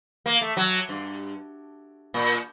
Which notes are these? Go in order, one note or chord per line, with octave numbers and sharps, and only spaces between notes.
A#3
A3
F#3
G2
A#2